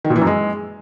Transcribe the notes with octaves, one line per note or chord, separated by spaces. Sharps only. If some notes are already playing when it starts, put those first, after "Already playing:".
D#3
A#2
E3
F#2
G#3